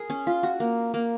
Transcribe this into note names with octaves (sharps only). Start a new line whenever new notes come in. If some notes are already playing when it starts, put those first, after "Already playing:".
Already playing: G#4 A#4
C#4
F4
F#4
A#3
A#3